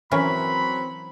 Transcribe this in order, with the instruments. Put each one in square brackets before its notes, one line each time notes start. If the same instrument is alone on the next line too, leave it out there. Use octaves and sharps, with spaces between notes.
[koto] E3 C#4 A#4 [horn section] F#3 C4 B5